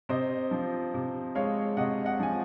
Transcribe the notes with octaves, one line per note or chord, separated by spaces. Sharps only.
C3 C5 D#5
F3
C3
G#3 C#5 F5
C3 D#5 F#5
D#5 F#5
F3 G#5